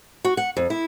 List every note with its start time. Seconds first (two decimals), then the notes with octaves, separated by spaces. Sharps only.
0.25 F#4
0.37 F#5
0.57 F2
0.70 E4